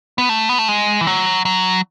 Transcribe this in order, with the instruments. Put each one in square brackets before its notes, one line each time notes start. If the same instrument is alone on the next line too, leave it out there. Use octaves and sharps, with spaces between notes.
[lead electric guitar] B3
A3
B3
A3
G#3
E3
F#3
F#3